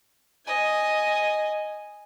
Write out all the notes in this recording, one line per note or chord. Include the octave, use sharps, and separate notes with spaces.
D#5 G#5